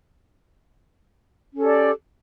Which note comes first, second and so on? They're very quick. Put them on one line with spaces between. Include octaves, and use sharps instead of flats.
C#4 A4 G4 D5